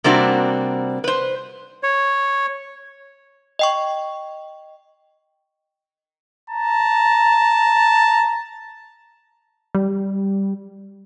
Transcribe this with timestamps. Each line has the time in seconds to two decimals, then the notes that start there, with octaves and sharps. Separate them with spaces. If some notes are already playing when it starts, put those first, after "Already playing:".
0.04 C3 G3 A#3 C4 D4 F#4
1.04 B4 C5
1.83 C#5
3.59 D#5 G5 C#6
6.50 A5 A#5
9.75 G3